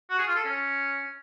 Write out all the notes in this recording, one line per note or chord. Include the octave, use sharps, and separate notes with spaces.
F#4
G#4
F4
A4
C#4